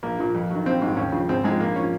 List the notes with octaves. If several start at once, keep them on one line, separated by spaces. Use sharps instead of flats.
A#1 A#3
A#2 F3
F2
D#3 F#3
A#1 C4
G#2 D#3 F#3
D#2 C#4
C#3 F3
G#1 C4
G#2 F3 G#3
A#1 A#3
F3 C#4